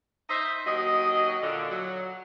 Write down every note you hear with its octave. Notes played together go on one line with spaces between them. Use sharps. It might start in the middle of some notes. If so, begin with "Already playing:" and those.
D#4 C5 D#5 E5
D#2 F#3 D#5
A#2 D3
F#3